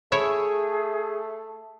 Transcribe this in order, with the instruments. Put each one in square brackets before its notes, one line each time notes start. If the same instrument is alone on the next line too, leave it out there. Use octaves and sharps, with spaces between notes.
[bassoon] A3 [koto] E4 C#5 E5 [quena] G#4